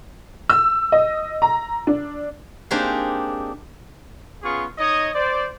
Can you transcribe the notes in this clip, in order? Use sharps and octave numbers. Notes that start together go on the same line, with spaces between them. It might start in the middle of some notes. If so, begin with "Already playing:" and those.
E6
D#5
A#5
D4
A#3 C4 D4 D#4 G4 G#4
B3 C#4 F4 G#4 C#6
D#4 C#5 D#5
C5 D5